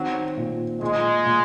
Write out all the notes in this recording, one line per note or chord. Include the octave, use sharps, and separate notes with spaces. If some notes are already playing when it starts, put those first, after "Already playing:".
Already playing: D#3 F#3 C4
A#2
A#2 G#3
A#2